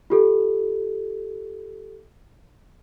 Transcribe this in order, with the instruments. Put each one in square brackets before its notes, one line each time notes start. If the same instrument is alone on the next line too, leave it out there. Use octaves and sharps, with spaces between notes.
[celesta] F4 G4 A4